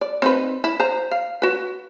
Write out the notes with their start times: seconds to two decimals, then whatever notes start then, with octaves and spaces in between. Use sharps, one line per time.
0.01 D5
0.22 C4 D#4 B4
0.64 E4
0.80 C5 A#5
1.11 F5
1.42 F#4 B4